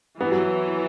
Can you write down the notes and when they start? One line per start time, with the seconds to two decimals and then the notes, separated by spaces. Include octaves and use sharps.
0.21 E3 B3
0.32 F#3